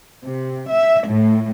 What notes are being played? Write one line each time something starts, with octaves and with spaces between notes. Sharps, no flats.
C3
E5
A2